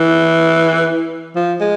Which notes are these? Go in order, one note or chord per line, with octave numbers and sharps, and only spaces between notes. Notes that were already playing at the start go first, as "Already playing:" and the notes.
Already playing: E3
F3
G#3